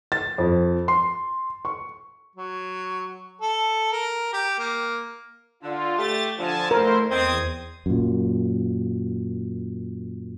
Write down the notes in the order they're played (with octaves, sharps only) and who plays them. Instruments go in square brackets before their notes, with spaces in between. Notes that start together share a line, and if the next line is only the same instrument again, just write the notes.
[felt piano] A6
F2
C6
C#6
[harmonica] F#3
A4
A#4
G4
A#3
[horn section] D3 [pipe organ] F4
[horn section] A3 G4 [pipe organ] A6
[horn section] D3 F3 [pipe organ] G#5 A5
[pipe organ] A3 E4 C5 [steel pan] A#4
[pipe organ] E2 D#6 G#6 [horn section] C4 D#5
[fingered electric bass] F#2 A#2